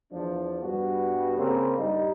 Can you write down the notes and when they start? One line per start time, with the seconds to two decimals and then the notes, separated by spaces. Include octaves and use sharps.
0.12 E2 F3 D4
0.62 G2 G3 B3 F#4
1.38 C#3 A#3 C4
1.78 G2 G3 D#4